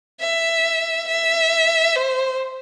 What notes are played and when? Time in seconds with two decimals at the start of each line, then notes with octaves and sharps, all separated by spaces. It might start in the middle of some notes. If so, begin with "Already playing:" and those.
0.21 E5
1.09 E5
1.95 C5